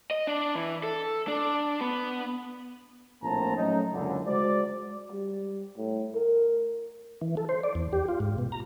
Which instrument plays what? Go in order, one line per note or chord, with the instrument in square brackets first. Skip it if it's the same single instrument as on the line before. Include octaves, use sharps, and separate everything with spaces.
[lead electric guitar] D#5
D4
E3
A4
D4
B3
[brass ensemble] A#1 A2 A#3 C4 A5 A#5
F#3 A3 C#4 D#4
F#1 C#2 F#2 D3
G#3 F#4 C5 D5
[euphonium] G3
A2
A#4
[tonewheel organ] E3
A4
C5
D5
E2
G4
F4
G#2
B2
A#5